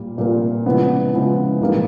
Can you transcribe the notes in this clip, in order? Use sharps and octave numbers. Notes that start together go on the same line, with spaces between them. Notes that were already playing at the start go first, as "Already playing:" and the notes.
Already playing: A#2 G3 A#3
A#2 G3 A#3
C#3 F3 G#3 B3 E4
C#3 F3 G#3 B3 E4
A#1 G#2 E3 G3 A#3